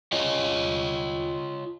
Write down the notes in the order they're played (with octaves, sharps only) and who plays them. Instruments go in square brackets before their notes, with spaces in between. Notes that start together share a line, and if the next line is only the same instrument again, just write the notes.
[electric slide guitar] F4 C#5 D#5